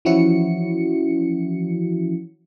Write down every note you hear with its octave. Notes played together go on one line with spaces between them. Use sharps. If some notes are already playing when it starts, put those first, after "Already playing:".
E3 F3 C#4 E4 F#4 C#7